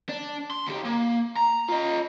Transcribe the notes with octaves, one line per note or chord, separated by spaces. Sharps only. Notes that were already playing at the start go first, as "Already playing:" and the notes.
D4
C6
D2 G4
A#3
A#5
F4 D#5